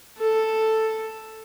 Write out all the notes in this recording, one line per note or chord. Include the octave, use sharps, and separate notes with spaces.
A4